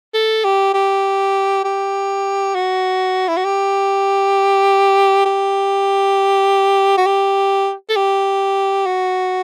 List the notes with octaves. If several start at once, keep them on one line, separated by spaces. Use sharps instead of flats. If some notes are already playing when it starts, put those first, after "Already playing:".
A4
G4
G4
G4
F#4
E4
F#4
G4
G4
F#4
G4
A4
G4
F#4